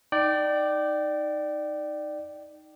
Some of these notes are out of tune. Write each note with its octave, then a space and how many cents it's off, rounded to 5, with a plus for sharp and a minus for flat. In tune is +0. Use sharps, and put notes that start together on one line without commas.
D#4 +0 D5 +10 G5 -20